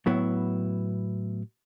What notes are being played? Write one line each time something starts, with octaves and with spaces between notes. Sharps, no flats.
A2 F#3 B3 E4